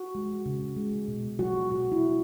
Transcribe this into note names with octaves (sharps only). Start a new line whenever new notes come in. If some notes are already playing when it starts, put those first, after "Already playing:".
Already playing: F#4
G#3
C#3
G#3
B2
F#3 F#4
B2 F#4
E4
F#3